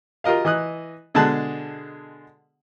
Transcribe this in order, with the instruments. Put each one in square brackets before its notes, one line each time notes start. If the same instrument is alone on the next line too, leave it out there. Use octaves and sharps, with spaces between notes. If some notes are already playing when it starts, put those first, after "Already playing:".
[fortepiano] F4 G4 A#4 D#5 F5
E3 D#5 D#6 F#6
B2 D3 G#3 G#4 A5 F#6